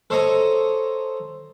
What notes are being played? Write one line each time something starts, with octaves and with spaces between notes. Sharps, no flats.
A4 C5 C#5 D#5 A#5